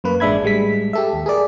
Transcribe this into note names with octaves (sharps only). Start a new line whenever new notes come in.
F#2 A#3 B4
A1 G#3 D4 E5 B5 G#6
A2 G3 G#3 B6
G4 A4 E5
D#2
G#4 A#4 D5